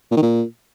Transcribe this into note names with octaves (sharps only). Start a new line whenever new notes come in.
A#2
D#3
A#2